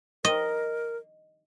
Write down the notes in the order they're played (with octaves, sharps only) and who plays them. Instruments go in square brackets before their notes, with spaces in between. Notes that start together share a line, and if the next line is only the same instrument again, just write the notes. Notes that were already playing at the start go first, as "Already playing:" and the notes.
[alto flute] A#4 [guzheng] D#5